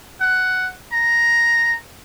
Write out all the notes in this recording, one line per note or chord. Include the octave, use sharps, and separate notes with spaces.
F#5
A#5